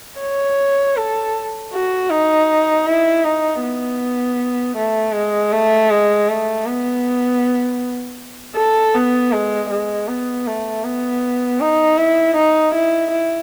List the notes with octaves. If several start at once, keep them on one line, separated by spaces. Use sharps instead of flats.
C#5
A4
F#4
D#4
E4
D#4
B3
A3
G#3
A3
G#3
A3
B3
A4
B3
G#3
G#3
B3
A3
B3
D#4
E4
D#4
E4
E4